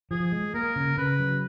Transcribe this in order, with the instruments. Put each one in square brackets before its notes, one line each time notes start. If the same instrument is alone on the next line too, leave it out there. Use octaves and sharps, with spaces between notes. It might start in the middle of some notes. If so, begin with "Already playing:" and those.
[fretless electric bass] F3 [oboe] G#4
[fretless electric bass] G#3
[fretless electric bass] A#3 [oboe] A#4
[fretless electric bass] C#3
[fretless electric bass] C#3 [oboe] B4
[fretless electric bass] F#3